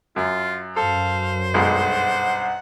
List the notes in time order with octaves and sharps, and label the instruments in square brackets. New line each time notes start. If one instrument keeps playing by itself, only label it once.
[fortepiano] F#2 [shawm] F4
[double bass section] F#2 [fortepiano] A4 [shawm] C5 [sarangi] F5
[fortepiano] B1 G2 G#3 [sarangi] F#5